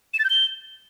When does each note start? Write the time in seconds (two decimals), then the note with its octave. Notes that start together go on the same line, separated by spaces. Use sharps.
0.13 E7
0.19 A6
0.24 G6
0.30 G7